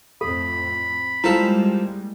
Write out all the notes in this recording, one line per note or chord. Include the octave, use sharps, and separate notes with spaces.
F2 A2 A4 B5
F3 G3 G#3 A#3 E4 A4